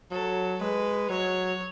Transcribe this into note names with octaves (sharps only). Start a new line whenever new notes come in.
F#3 A4
G#3 B4
F#3 C#5